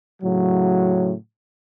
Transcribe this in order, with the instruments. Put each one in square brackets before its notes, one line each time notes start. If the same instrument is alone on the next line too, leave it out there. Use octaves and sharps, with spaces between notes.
[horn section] A2 C#3 F#3